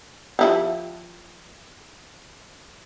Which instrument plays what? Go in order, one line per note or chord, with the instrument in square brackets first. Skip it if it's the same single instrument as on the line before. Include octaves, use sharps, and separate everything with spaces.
[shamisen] F3 E4 G4